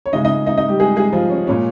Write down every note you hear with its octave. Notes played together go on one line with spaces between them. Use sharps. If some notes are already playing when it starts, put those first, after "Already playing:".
C#5
C#3 G#3 D#4 D#5
D#4 D#5
D#4 D#5
D#4 D#5
G3 G4
G#3 G#4
G#3 G#4
F3 F4
C#4
A#2 G#3 C#4